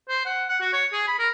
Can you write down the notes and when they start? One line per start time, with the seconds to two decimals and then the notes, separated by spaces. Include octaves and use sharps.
0.09 C5
0.25 F#5
0.49 F#5
0.61 F#4
0.73 C#5
0.92 G#4
1.08 B5
1.19 A#4